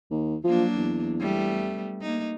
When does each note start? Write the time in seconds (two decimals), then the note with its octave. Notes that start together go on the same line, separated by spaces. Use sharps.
0.11 D#2
0.44 F3 F#3 A#3 D4
0.76 E2
1.20 G3 A3 B3
2.01 A#3 D#4